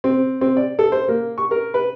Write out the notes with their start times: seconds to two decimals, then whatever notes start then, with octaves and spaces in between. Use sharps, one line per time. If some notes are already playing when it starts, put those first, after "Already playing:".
0.04 C4
0.41 C4
0.57 D5
0.79 A4
0.92 C5
1.08 A#3
1.38 C#6
1.51 A#4
1.74 B4